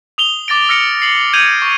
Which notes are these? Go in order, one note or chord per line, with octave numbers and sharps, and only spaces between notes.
D#6 F7 G7
D6 A6 A#6 D7
E6 F6 A#6 C#7 D7 F7
C7 F#7
G6 G#6 C#7 D#7 F7 F#7
C#6